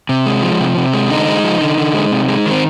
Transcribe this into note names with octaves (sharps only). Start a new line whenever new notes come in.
C3
G#3
F3
C3
C3
G#3
D3 D#4
G#3
F3
D3
D3
G#3
C3
G#3
D#3 C4